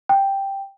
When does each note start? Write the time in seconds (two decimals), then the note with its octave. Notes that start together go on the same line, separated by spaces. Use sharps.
0.09 G5